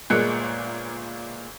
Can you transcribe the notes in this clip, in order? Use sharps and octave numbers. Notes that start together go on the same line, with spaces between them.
G1 A#2 G#3 A#3 F#6 C#7